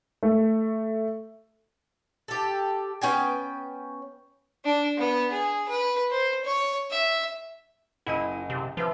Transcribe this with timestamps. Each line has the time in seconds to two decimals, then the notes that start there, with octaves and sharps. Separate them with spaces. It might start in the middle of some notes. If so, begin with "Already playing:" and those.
0.23 A3
2.28 G4 A4
3.02 B3 C#4 G5 G#5
4.65 D4
4.98 B3
5.32 G#4
5.69 B4
6.11 C5
6.45 C#5
6.90 E5
8.06 F#1 E4 D#5 D#7
8.50 C3
8.77 F3 B4 E5